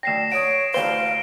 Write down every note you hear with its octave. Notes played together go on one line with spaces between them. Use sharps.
D2 G5 A#6 C7 E7
C#5 F#5 D#6 D7
A1 D2 C5 F5 G7